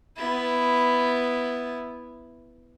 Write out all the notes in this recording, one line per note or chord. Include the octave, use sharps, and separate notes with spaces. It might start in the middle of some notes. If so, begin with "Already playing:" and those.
B3 E4